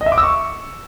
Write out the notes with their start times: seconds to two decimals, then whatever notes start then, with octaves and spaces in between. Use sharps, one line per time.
0.01 D#5
0.06 E5
0.12 D6
0.17 E6
0.23 C#6